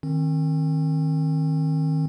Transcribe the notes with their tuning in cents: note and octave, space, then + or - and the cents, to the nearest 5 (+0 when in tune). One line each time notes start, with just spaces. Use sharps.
D#3 +0 C4 +40